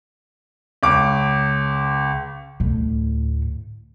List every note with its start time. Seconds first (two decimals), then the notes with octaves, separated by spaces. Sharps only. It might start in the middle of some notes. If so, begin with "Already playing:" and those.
0.83 C#2 D6
2.60 D2 A2